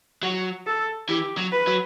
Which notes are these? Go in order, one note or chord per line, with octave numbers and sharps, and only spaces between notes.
F#3 F#4
A4
E3 G4
F#3
B4
F#3